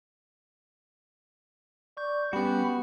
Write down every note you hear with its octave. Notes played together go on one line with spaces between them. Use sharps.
D5 C#6 G6
G3 B3 C#4 F#4 G4 B5